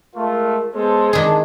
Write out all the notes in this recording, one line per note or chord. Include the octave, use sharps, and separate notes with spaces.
G#3 A3 F4 A#4
G#3 B3 A4 C5
E2 D#3 D4 G#4